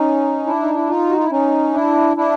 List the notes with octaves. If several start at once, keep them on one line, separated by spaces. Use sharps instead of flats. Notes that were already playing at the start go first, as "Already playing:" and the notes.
Already playing: C#4 D#4
D4 E4
D#4
E4
D#4 F4
F#4
F4
E4
C#4 D#4
D4 E4
D4 E4